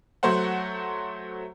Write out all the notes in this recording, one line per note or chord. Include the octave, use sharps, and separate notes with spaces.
F#3 A3 C5 F#5